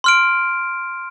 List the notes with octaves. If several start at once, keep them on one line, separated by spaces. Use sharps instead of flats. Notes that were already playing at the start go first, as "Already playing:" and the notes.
C6 F6 D7